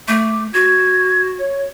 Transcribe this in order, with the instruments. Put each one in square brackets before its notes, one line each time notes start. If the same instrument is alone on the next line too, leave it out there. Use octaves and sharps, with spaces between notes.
[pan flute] A3 [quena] D6
[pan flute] F#4 [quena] G#6
[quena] C#5